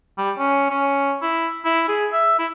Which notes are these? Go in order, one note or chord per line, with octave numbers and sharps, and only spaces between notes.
G3
C#4
C#4
E4
E4
G#4
E5
E4